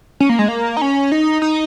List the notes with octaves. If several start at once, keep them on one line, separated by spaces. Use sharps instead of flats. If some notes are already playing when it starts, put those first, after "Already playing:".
C#4
A#3
G#3
A#3
D#4
C#4
D#4
D#4